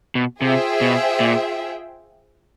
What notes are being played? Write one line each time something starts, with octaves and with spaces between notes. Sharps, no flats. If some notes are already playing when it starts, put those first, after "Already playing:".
B2
C3 F4 G#4 C5 E5 G5
B2
A#2